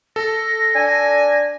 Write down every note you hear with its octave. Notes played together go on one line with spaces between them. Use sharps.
A4 A#6
D4 G#5